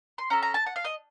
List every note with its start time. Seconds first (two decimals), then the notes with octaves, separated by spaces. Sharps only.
0.18 C6
0.30 C#4 A4 A#5
0.42 A#5
0.54 A5
0.66 F#5
0.76 F5
0.85 D#5